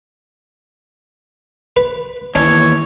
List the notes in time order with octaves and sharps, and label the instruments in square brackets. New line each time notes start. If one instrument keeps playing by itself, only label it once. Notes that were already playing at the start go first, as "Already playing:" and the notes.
[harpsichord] B4
[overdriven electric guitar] D#2 E3 [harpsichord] C#4 D4 [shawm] C#5